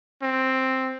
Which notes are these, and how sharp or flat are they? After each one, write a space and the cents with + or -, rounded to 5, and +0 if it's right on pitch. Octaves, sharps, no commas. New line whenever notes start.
C4 +5